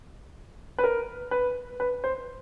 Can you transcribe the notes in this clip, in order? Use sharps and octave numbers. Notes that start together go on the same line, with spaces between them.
B4
A#4
B4
B4
C5